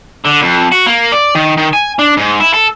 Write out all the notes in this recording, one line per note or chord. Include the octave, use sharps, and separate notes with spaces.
D3
F2
F#4
A#3
D5
D#3
D#3
G#5
D4
G#2
E4
A4